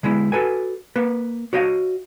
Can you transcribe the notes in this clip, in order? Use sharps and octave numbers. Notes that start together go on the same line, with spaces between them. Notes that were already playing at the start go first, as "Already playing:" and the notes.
D3 G#3 B3 E4
F#4 A4 B4 G#5
A#3 B4
F#4 C#5 D#5 F5